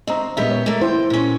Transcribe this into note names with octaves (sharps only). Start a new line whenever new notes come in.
D2 C4 D#5 A#5
A#2 G#3 B3 G4 D#5 E5
C#5
A3 A#3
E4 C5 G5
A#2 C#4